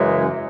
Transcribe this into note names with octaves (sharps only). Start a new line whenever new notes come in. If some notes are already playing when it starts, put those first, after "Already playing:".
Already playing: F#2 C#3 E3 G#3